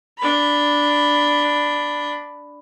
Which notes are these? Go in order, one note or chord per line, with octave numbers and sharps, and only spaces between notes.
D4 B5